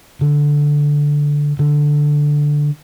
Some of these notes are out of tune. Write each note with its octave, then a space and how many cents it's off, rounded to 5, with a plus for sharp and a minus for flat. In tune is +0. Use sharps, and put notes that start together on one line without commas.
D3 -5
D3 +0